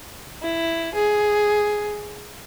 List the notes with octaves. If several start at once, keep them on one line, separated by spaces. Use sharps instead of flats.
E4
G#4